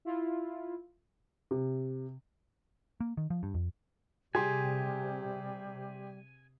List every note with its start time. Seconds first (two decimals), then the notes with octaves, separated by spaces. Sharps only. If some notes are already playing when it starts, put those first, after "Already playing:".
0.05 E4 F4
1.51 C3
3.00 A#3
3.17 D#3
3.30 F3
3.43 G2
3.54 F2
4.35 C3 G3 G4 G#4 G#5 C6